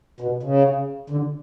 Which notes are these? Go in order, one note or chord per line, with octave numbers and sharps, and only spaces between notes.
B2
C#3
D3